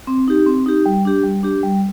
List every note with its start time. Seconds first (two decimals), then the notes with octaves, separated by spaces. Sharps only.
0.07 C4
0.28 D#4 G4
0.46 C4
0.66 D#4 G4
0.86 G3
1.05 D4 G4
1.24 G3
1.43 D4 G4
1.63 G3